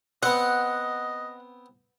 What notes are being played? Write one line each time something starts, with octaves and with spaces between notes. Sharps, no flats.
B3 C4 D#5 F#5